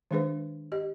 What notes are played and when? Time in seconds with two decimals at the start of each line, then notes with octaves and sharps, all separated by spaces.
0.11 D#3 G#3 D4 G#4 B4 C5
0.72 G4 D#5